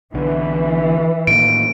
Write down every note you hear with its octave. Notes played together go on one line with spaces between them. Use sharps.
B1 D3 E3
A2 D#3 A#3 D7